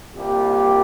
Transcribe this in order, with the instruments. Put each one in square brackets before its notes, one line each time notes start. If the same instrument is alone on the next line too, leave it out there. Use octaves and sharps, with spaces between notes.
[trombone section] C2 A#2 G3 A#3 G4